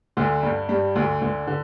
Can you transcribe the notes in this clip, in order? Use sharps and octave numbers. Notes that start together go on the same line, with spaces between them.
D2 D3
G2 G3
G2 G3
D2 D3
D2 D3
D3